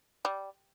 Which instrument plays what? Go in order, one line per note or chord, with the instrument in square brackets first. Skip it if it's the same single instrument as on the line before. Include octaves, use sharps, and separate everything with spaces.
[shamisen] G3